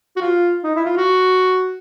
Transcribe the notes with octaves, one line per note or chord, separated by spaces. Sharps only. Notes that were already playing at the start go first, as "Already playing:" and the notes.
F#4
F4
D#4
E4
F4
F#4